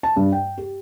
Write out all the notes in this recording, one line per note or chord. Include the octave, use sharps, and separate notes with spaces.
A5
G2
G5
G4